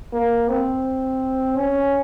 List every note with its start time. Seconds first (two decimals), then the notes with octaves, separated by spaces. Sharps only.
0.13 A#3
0.49 C4
1.57 C#4